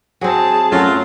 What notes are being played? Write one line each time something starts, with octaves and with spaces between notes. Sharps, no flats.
F#3 C4 G#4 A5
F#2 F#3 A3 F4